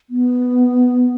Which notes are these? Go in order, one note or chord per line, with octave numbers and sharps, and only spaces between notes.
B3